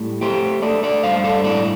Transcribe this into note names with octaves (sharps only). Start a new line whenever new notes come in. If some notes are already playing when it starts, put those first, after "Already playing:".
Already playing: A2 G3
A3 G4 C5
A3 A4 D5
A4 D5
G2 C5 F5
A4 D5
A2 A4 D5